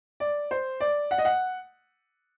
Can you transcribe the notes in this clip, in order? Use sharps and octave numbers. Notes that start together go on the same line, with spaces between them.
D5
C5
D5
F#5
D#5
F#5